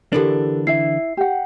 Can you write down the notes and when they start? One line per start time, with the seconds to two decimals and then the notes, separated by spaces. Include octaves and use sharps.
0.13 D3 E3 D4 G4 A4 A#4
0.67 E4 E5 C7
1.17 G4 F#5